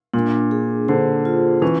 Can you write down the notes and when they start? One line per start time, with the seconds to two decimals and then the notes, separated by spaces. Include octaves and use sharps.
0.14 A#2 D4
0.51 G#4
0.88 D3 C5
1.25 F4
1.62 E3 C#4